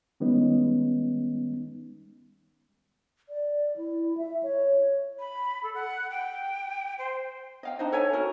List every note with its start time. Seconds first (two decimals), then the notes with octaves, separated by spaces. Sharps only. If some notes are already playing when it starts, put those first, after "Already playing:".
0.20 D#3 G3 G#3 B3 C#4 D#4
3.29 D5
3.77 E4
4.18 E5
4.43 C#5
5.19 B5
5.63 A4
5.75 F#5
6.11 G5
6.99 C5
7.63 D#5 F5 G5
7.79 D4 D#4 C5 D#5
7.92 A4 C#5 E5 G#5
8.13 D#4 F#4 A#4